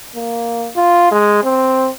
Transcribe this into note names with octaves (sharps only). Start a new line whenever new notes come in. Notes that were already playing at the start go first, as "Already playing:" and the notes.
A#3
F4
G#3
C4